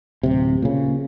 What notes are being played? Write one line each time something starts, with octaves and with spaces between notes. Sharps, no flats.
D1 C3
A#2 C#3